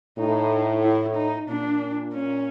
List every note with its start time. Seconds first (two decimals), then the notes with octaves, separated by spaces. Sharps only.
0.19 A2 D#4
0.84 E4
1.15 D#4
1.49 A#2 D4
2.13 C#4